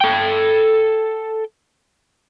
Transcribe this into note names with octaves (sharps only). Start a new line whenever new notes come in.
A4 G5